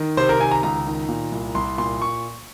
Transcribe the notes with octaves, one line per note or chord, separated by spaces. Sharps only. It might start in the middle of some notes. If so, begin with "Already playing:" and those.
Already playing: D#3
C3 C5
A#4
D#3 G#5
A#5
C#2 A#5
D#3
A#2
C2
C2 C6
A#2 C6
C#6